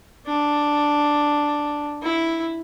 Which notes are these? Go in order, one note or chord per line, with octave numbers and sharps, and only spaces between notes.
D4
E4